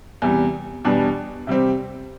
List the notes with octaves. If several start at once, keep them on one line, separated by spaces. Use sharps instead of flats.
E2 C3 G3
E2 B2 G3 D4
C3 G3 C4